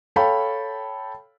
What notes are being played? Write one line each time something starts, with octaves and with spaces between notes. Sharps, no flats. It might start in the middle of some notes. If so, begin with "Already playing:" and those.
A4 C#5 F5 G5 B5